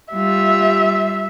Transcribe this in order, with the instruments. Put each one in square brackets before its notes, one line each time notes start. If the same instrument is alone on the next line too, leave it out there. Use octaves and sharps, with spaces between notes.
[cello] G3 F4 [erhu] E5